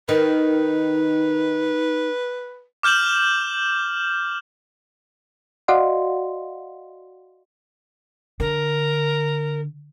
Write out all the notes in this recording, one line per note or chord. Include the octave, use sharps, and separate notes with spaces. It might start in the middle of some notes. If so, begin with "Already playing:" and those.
D#3 D#4 B4
D6 F6 G6 E7 F#7
F#4 D5 D#5 F5 F#5 C6
D3 A#4